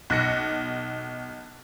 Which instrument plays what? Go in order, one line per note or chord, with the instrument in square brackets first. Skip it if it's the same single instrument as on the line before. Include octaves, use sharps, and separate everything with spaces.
[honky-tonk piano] B1 F#6 A#6 C#7